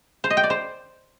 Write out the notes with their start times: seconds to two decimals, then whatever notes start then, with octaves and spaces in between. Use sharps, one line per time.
0.24 C5
0.30 D#5
0.37 G5
0.44 D5
0.50 C5